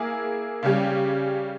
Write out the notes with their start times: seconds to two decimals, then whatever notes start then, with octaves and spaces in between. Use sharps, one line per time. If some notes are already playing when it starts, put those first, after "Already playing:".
Already playing: A#3 E4 G#4
0.63 C#3 G3 C#4 G4